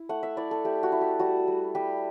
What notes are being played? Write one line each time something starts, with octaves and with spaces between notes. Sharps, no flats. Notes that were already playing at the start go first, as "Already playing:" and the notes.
Already playing: E4
A3 F#5
E5
E4 D5
A4
A3 G4
F#4
E4
G4
G3 F#4
G3
G3 G4